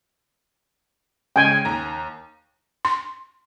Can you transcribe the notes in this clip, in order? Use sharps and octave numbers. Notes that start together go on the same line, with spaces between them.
C#3 G#3 G5 G#5
D#2 A#5
C6